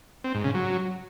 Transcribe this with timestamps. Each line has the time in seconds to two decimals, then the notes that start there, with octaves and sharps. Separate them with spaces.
0.24 C4
0.34 G#2
0.44 C#3
0.54 F#3